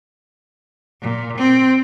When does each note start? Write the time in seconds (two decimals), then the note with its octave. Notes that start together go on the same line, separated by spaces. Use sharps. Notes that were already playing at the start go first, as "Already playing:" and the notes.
1.00 A#2
1.35 C4